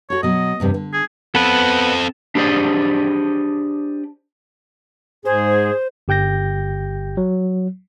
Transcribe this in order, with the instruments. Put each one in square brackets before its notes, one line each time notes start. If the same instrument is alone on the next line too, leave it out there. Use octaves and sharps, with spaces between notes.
[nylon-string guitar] F#4 A4 [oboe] C#5
[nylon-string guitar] B2 F#3 [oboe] D#5
[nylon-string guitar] E2 G2 C3
D3
[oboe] G#4
[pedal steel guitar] B3 B4 [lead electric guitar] C4 A4
[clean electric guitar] D4 G4 G#4 C5 D5 D#5
[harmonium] G#2 [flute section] G#4 [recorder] C5
[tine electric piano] G1 G4 G5 G6 A#6
F#3